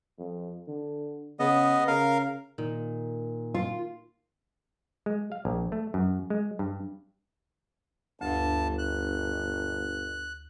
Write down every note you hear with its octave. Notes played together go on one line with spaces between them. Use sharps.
F2
D3
C#3 B3 D#5
C#3 A#4 F5
A#2 D#3
F4
G#3
F5
A#1
A3
F#2
G#3
G2
G1 D2 G2 A5
F#6